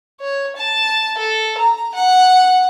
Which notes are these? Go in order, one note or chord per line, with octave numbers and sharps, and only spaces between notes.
C#5
A5
A4
A#5
F#5